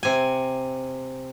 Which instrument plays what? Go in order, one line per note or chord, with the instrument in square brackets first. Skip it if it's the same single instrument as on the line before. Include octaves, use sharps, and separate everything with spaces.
[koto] C3 G#5